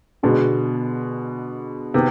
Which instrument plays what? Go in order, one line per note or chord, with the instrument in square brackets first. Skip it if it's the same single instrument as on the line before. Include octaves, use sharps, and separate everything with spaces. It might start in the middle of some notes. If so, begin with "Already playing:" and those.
[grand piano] B2 [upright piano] D3 G#3 B3 D4
[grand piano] C3 [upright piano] D#3 B3